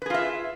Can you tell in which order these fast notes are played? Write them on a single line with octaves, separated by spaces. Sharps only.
B4 G#4 F4 E5